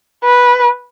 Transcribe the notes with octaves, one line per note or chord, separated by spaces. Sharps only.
B4